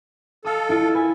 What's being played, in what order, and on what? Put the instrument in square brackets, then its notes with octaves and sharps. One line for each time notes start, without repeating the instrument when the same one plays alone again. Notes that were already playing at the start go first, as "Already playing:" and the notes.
[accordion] A4 [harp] F5 D#6
[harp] E4 F4
B4 G#5